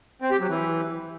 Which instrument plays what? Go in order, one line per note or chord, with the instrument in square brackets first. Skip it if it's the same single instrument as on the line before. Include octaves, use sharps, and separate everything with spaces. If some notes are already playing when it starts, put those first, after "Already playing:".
[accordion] C4
G4
F#3
E3